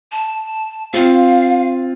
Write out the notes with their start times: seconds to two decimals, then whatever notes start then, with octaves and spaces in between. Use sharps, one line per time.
0.12 A5
0.94 C4 F4 F5